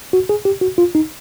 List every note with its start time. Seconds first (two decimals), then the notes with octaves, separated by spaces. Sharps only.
0.13 F#4
0.29 G#4
0.45 G4
0.61 F#4
0.78 F4
0.95 D#4